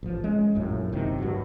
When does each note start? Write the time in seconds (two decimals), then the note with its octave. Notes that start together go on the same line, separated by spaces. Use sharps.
0.03 A1 F3
0.24 G#3 A3 C#4
0.55 A#1 F#2 A2
0.93 F#1 C3 D#3
1.18 G2 F#3